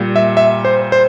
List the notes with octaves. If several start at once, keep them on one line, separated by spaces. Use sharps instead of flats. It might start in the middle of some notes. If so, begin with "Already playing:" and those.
Already playing: A#2 G3
E5
E5
C5
C5